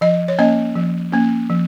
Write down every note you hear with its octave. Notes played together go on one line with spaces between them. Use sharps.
F3 D#5
C#5
A#3 C#4 D#5
F3
A#3 C#4
F3